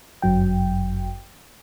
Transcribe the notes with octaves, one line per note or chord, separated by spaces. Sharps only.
G1 F#2 F#3 G5